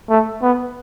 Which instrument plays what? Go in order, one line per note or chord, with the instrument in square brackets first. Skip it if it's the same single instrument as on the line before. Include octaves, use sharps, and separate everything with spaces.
[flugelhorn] A3
B3